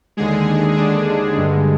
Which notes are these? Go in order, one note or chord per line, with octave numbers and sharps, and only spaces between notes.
D#2 D3 G#3 G#4
D4
G2 D3 G#3